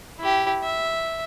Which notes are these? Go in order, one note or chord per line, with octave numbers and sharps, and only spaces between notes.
E4 G4
E5